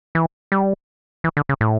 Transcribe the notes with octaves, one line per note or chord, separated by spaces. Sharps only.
E3
G3
E3
D3
C#3
A2